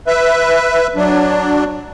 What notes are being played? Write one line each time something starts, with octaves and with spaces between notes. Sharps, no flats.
B4 E5
F#3 D4